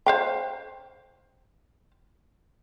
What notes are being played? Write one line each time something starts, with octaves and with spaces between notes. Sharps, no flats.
C5 F5 G5